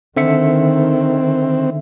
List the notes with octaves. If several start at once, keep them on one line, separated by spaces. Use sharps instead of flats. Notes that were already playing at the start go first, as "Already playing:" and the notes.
D3 D#3 C4 E5 C#7